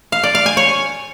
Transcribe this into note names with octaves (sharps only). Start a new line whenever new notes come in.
F5
D5
F5
G#5
C#5